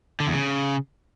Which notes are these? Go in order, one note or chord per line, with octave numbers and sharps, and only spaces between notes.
D3
E2
C#3